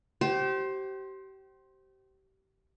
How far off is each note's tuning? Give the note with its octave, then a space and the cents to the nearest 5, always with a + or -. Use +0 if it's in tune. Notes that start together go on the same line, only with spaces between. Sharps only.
G4 -30 C5 +15